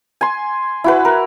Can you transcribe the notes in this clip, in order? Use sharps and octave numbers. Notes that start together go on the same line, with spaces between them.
G#5 C6
E4 F#4 B4
A#4